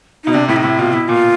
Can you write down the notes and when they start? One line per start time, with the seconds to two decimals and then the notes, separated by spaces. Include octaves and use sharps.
0.24 B2 D#4
0.34 C3 D4
0.48 A2 E4
0.56 D#4
0.63 A2 E4
0.78 B2 F4
0.93 B2 E4
1.08 A#2 F4